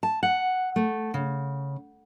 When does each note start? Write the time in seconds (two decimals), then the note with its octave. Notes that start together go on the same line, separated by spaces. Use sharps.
0.03 A5
0.23 F#5
0.76 A3
1.14 C#3